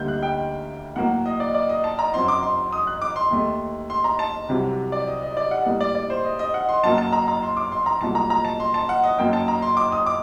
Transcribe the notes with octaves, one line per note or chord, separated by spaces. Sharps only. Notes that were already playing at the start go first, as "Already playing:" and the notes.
Already playing: D2 D3 G3 A#3 G6
F#6
G5
A2 F#3 A#3 F#5
D#5
D5
D5
D#5
A5
A#5
F#2 F#3 C4 D#4 C6
D6
C6
D#6
F#6
D6
C6
D#2 D#3 A3
C6
A#5
A5
C2 C3 F#3
D5
D#5
D#5
D5
F#5
A2 G3 A#3 D#5
D5
D5
C5
D#5
D#5
F#5
C6
F#2 F#3 A#3 A5
A5
A#5
A#5
C6
D6
C6
A#5
C2 A#2 F#3 A3 A5
A#5
A#5
A5
C6
A5
F#5
D#5
F#2 F#3 A#3 D#4 G5
A5
A#5
C6
D6
D#6
D6